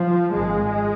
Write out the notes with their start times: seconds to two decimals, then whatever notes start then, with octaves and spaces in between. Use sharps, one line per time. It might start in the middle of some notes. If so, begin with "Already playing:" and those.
Already playing: F3
0.33 G#1 G#2 G#3